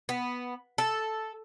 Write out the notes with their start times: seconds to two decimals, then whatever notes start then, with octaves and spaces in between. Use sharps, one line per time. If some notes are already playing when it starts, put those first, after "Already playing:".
0.09 B3
0.78 A4